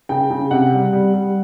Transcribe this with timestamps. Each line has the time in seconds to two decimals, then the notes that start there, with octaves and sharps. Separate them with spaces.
0.09 C#3 G5
0.30 C#3
0.51 C3 F#5
0.72 G3
0.93 G3
1.14 G3